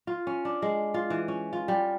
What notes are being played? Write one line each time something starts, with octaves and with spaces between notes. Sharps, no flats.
F4
C#4
D4
G#3
F4
E3
C#4
F4
G3